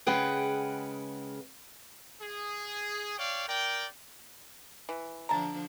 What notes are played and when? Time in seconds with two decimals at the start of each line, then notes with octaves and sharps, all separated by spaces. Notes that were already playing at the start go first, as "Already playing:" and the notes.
0.07 C#3 G#3 G#4 B4 F#5 G5
2.21 G#4
3.18 C#5 D5 F5 G5
3.48 A#4 D5 G5
4.89 E3
5.29 D3 F3 D4 A5 A#5